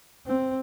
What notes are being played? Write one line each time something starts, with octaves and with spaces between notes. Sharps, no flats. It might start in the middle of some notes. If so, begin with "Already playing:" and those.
C4